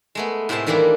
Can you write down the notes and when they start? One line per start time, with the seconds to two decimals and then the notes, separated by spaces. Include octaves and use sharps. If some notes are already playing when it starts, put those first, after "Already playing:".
0.15 G#3 A3 B3
0.49 A2 C3 G#3 C5 E5 A5
0.66 D#3 E3 G3 A#3 D4 E4